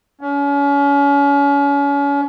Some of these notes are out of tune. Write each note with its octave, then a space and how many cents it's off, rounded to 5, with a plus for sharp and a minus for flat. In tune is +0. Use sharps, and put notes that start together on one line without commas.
C#4 +35